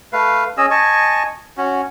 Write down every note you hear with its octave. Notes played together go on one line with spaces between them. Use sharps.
A3 B4 F5
C#4 G#4 D#5 E6
D#5 G#5 A5 C#6
C#4 F#4